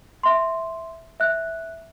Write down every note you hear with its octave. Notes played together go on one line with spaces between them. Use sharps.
E5 C6
E5 F#6